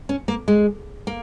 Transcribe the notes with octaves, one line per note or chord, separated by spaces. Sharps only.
C#4
A#3
G#3
A#3